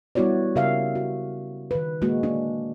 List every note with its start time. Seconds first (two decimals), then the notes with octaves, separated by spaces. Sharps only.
0.15 G3 B3 E4 F#4 C#5 D5
0.56 C#3 G4 A#4 E5 F5
0.95 F#4
1.71 D#3 B4
2.02 G#3 A#3 F#4
2.23 D4